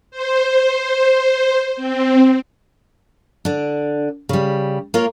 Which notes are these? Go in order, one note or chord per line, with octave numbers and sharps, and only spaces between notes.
C5
C4
D3 D4
C#3 G3
A#3 F4 A#4 C#5